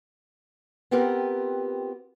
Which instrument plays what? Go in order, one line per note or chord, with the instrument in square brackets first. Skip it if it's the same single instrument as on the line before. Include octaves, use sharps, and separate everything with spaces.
[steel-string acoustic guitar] B3 C4 F4 G4 A#4 B4